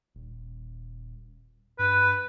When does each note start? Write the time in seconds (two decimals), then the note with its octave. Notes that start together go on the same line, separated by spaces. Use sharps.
0.15 D#1
1.79 G2 B4